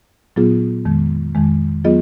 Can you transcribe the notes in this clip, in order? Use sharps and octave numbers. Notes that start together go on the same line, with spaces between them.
A#2 F#3 B3 F4 G#4
F2 D#3 G#3
F2 D#3 G#3
F#3 B3 F4 G#4 D#5